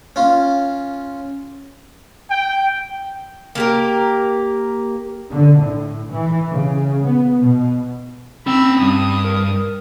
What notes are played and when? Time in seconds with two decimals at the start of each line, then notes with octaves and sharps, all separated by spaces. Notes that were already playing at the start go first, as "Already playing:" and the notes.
0.16 C#4 F4
2.30 G5
3.55 A#3 G4 A#4
5.29 D3
5.59 A2
6.10 E3
6.50 C#3
7.05 B3
7.40 B2
8.46 C4 C#4 G5 B5 E6
8.80 G2 D#6
9.25 A#4